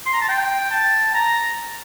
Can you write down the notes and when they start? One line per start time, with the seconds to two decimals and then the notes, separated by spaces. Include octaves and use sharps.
0.06 C6
0.13 A#5
0.21 A5
0.28 G5
0.71 A5
1.14 A#5